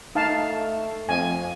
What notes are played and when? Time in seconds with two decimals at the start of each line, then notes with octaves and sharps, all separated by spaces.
0.15 A3 D#4 F5 A5
1.09 F2 G#5